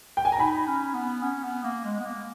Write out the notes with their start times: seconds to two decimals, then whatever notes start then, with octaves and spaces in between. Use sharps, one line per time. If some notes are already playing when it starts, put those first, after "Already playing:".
0.17 G5
0.25 G#5
0.32 A#5
0.39 D#4 G#5 B5
0.67 C#4
0.94 B3
1.23 C#4
1.44 B3
1.64 A#3
1.85 G#3
2.00 B3
2.05 A#3